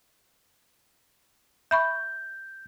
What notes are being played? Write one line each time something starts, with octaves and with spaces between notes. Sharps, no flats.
E5 B5 C#6 G6